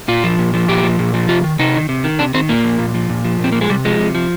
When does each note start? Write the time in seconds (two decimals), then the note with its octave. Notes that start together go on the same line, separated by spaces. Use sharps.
0.08 A#2 F4
0.24 F3
0.39 A#2
0.54 F3
0.68 A#2 G4
0.84 F3
0.99 A#2
1.14 F3
1.29 C3 F4
1.44 D#3
1.59 C3 D#4
1.74 D#3
1.89 C3
2.04 D#3
2.19 C3 D4
2.34 D#3 C4
2.49 A#2 A#3
2.64 F3
2.79 A#2
2.94 F3
3.10 A#2
3.24 F3
3.40 A#2 C4
3.52 F3 A#3
3.61 G#3
3.69 C3 G3
3.85 F3 G#3
3.99 C3
4.15 F3